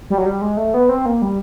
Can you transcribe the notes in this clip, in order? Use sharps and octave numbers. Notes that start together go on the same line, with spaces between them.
G3
F#3
G3
G#3
A3
B3
C4
A#3
G3